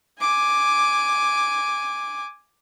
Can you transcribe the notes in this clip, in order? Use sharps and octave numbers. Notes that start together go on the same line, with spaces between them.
G#5 D6